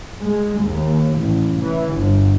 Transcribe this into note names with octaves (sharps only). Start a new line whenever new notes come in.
G#3
D#2
A1
E3
G1